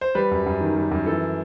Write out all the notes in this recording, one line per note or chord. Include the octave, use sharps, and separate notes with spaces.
C5
G3 B4
F#2
F#2
D#3
G3
F#2
E3 A4